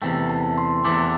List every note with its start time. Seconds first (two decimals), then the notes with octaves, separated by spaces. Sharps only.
0.02 E2 C3 E3 A3 G5
0.29 A5
0.58 C6
0.85 E2 C3 E3 A3 D6